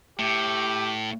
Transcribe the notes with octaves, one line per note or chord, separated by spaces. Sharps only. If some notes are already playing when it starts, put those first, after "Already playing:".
A2 G4